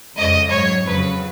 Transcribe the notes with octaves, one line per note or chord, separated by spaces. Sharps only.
F2 C#3 G#3 D#5
G#2 F#3 C#5
F2 C#3 F#3 B4